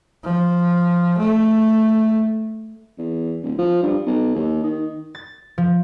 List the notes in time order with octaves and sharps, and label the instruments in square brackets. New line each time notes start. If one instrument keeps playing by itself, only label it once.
[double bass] F3
A3
[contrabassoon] E2
D1
F3
G2
B1
D#2
D#3
[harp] A6
F3